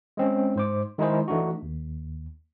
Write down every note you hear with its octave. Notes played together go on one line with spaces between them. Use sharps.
G#3 C4 C#4
G#2 C5 D6
D#3 G#3 D#4 E4 G#4 C5
E3 A3 D4 D#4 F#4
D#2